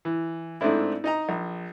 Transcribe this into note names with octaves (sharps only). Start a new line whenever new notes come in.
E3
G#2 A3 C4 D4 E4
D#4 D#5 A#5
A#1